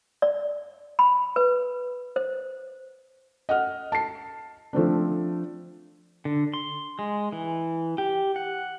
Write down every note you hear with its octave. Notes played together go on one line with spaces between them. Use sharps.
D5
B5
B4
C5
D#5 F#5 F6
A5 C7
F3 A3 C4 D4
D3
C6
G#3
E3
G4
F#5